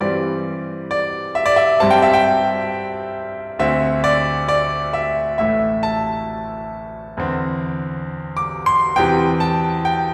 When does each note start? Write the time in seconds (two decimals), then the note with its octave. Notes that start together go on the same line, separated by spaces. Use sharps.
0.01 G2 E3 G3 C4 D5
0.91 D5
1.35 E5
1.46 D5
1.56 E5
1.80 G2 G3 C4 A5
1.90 G5
2.02 E5
2.13 G5
3.59 D2 D3 C4 E5
4.04 D5
4.48 D5
4.93 E5
5.38 A1 A2 A3 E5
5.83 A5
7.17 E2 D3 C4
8.37 D6
8.66 C6
8.96 E2 C3 E3 G5
9.40 A5
9.85 G5